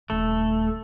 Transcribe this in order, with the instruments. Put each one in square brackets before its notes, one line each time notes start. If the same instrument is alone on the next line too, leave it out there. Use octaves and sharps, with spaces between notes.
[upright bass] D#1 D#3 [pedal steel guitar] A3